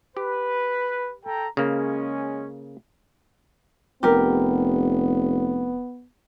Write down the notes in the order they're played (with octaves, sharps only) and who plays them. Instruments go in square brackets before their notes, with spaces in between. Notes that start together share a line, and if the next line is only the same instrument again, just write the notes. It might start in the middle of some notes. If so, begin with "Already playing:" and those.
[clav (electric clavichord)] G4 [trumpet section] B4
[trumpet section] A4 G5 A#5
[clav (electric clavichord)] C#3 A#3 [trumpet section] G#3 C#4
[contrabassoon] F1 [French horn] B3 [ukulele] G4 A#4